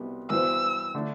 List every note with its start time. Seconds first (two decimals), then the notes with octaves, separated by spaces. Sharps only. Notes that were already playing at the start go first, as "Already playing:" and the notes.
Already playing: C2 B2 G3 B3
0.30 G2 E3 B3 F#4 C5 E6
0.95 D3 A3 D4